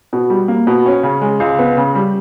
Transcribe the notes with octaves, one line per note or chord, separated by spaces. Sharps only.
B2
G3
A#3
B2
C#4
C#3
G#3
C#2
B3
C#3
G3